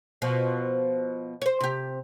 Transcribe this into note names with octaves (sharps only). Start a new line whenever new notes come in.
B2 F3
C5 C#5
C3 G4